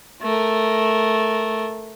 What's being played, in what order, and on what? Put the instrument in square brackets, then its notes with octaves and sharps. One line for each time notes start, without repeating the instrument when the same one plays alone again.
[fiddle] A3 A#4